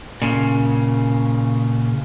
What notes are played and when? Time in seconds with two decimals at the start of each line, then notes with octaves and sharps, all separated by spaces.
0.22 A#2 C#3